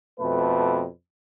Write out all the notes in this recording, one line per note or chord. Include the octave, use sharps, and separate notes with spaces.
F2 B2 A3 B4